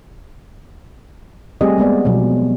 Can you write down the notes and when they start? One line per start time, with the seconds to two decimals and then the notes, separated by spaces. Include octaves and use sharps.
1.61 G3 A3 C4 G4 G#4 D#5
1.78 G#3 B3 D5
2.05 B2 F3 F#3